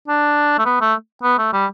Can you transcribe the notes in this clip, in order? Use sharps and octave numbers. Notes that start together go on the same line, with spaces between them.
D4
A3
B3
A3
B3
A3
G3